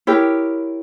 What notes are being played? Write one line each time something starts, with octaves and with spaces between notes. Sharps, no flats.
E4 G4 A#4 C#5